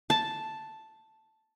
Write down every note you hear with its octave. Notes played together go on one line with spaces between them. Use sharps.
A5